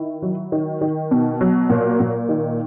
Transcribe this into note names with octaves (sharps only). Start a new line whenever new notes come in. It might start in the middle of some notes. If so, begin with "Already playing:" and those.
Already playing: D#3 E4
F#3
D#3
D#3
B2
F#3
A#2
A#2
D#3